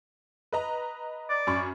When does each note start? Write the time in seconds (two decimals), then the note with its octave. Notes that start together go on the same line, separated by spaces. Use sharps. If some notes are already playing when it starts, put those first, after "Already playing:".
0.53 B4 D#5 A#5
1.30 D5
1.47 F#2 B5 C#6